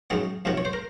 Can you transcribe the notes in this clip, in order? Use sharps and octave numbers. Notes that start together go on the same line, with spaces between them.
F#2 D#3 F#3 G#4
F2 C3 D#3 F#3
C#5
C5
A#4